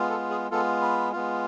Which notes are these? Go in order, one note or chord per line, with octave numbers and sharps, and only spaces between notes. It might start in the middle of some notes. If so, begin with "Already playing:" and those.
Already playing: G#3 B3 F4
A4
G#4
G#3 B3 F4 A4
B4
G#3 B3 F4